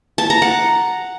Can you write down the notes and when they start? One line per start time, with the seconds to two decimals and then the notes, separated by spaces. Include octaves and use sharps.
0.18 A5
0.30 A#5
0.42 F#5